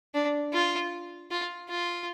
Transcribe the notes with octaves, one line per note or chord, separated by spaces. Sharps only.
D4
F4
F4
F4